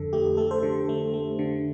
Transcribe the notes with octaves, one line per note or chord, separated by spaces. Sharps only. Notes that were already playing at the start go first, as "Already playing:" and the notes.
Already playing: F2 D3 A4
A3 G4
A3 A4
A4 C5
D3
A3
A3
D3